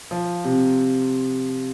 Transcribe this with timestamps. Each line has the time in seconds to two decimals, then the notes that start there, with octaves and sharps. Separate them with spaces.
0.11 F3
0.45 C3